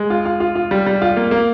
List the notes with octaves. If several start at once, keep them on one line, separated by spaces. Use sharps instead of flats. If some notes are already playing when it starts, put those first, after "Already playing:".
Already playing: G#3
F4
F4
F4
F4
G3
G3
F4
A#3
A#3